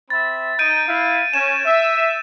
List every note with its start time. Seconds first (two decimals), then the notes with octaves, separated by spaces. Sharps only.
0.10 C4 E5 B5 A6
0.59 D#4 G6 D7 D#7
0.88 E4 F5
1.33 C#4 G#5 E7
1.66 E5